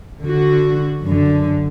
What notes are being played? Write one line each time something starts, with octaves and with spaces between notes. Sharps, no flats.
D3 F#4
F#2 D3